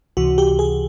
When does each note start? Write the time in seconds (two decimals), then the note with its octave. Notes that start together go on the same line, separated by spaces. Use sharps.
0.17 C#2 C3 E3 F#4
0.38 G4
0.59 G#4